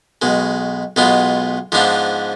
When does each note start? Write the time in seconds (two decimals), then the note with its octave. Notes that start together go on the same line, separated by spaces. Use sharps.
0.22 B1 B2 G#3
0.96 B1 B2 G#3 B3 F4
1.72 G#2 F3 B3 D4 F4